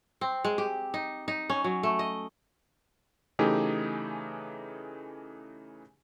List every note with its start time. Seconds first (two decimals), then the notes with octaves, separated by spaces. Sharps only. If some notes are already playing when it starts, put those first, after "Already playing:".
0.21 C4
0.45 G#3
0.58 G4
0.94 D#4
1.28 D#4
1.50 C#4
1.64 F#3
1.83 A3
1.99 D#5
3.39 C#3 E3 A3 D#4 G4 G#4